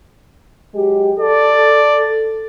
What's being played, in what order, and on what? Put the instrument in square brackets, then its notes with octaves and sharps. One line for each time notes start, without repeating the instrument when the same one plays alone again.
[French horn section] F#3 G#3 G4
[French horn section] A4 [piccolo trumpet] D5